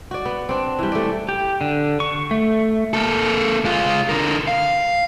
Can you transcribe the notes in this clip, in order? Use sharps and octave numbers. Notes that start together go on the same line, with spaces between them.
F#4 D5
B3
C4 D4
E3 G3
A3 D5
G4
D3
C#6
A3
A#3 A4
G#3 F4
D3 A#4
F5